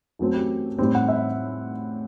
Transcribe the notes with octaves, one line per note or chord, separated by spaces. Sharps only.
F#2 F#3 A3 C4
G4
A2 G3 C4 G4
F#5
E5